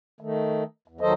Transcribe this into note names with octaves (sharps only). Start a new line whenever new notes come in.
D#3 A3
E2
D#2 D#3 F#3 A4 C5 D#5